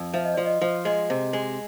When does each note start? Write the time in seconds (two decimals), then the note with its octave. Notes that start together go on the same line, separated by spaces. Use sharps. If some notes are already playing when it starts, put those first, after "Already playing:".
Already playing: F2
0.14 F3 E5
0.25 D#5
0.34 F3 D5
0.46 D#5
0.62 F3
0.85 G#3 D#5
1.10 C3
1.33 G#3